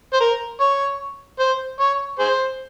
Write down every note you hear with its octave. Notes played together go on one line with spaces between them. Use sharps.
C5
A#4
C#5
C5
C#5
G#4 C5